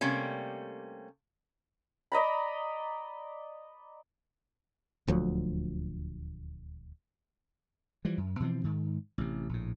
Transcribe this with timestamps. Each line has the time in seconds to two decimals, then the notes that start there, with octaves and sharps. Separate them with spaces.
0.01 C3 G3 A3 A#3 C#4
2.12 D5 D#5 A#5 B5
5.07 D#1 D2 F3 F#3
8.05 E3 F3 G3
8.18 F#2
8.40 B2 E3 F3 C4
8.64 G#2 D#3
9.18 A1 C3
9.49 A#1 A2